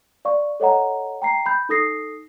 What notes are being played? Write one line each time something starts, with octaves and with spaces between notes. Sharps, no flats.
D5 F5 C#6
A4 C#5 D#5 F#5 A#5
G5 A#5 C7
B5 G6
D#4 A4 D#6 A#6 C7